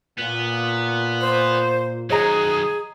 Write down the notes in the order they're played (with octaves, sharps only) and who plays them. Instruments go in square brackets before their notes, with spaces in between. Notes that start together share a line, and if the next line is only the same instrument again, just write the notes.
[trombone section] A#2 [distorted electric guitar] B3
[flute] C5
[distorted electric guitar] D#3 F#3 [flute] G#4 [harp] C#5 D#5 A#5